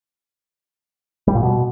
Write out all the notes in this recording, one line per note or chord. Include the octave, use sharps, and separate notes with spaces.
G3
A#2
B2